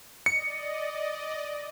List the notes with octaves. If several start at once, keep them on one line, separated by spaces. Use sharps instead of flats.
D5 D#5 C#7